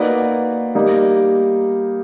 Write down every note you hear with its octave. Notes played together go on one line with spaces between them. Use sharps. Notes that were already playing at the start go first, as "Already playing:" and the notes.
Already playing: A#3 D#4 F#4 B4 D5
G3 A#3 D#4